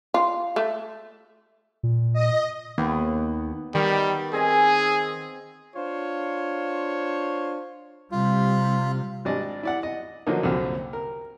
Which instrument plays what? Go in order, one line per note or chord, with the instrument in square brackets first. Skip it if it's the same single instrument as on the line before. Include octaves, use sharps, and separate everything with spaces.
[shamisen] F4
A3
[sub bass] A#2
[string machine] D#5
[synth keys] D#2 [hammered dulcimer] B3
[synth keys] D#3 [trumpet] G3
[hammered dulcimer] C4 D#5 G#5 [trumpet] G#4
[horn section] D4 F4 C5 C#5
[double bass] C3 G3 [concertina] F4
[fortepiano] G#1 G3 D4 D5 D#5
E4 D5 F#5
D#5
D3 F3 F#3 A#3 D#4
C2 F#2 A#2 D3 G3
A#4